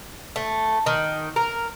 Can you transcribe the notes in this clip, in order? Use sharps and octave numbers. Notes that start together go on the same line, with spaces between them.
A3
D#3
A#4